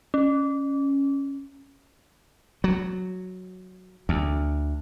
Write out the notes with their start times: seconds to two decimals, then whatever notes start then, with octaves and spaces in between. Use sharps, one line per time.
0.14 C#4
2.64 F#3
4.09 D2